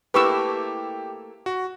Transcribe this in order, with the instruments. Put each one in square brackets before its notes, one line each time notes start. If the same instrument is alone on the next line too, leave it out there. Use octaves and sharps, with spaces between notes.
[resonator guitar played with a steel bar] A3 A#3 E4 [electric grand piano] G4 [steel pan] B4 C#6 E6
[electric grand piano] F#4